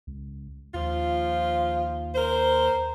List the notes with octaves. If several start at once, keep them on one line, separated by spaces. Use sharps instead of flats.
C#2
D#2 F3 F4
A#4 C5